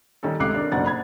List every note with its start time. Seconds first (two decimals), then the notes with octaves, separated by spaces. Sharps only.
0.23 D#3 G3 C#4 A4
0.40 C#2 C3 A3 D6 F#6 C7
0.54 D4 A#4
0.72 F#1 B2 D5 F#5 A6
0.86 B5 G#6